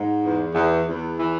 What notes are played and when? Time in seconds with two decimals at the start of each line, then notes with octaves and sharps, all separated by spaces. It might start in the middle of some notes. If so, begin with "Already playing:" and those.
Already playing: G#2
0.22 E2
0.54 E2
0.86 E2
1.17 E3